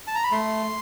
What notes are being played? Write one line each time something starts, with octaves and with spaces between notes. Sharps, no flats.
A5
A#5
B5
A3 C6